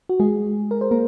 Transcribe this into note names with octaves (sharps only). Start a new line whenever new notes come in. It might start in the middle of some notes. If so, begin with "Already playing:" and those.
F#4
G#3 G#4
A#4
C5
A#3 A#4